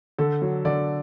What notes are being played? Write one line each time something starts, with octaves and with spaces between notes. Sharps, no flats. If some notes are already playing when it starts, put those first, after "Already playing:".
D3 A4
F#3
D3 D5